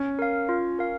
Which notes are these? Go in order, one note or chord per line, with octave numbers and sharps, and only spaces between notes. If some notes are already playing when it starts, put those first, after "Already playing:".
Already playing: C#4
A#4 F5
F4
A#4 F5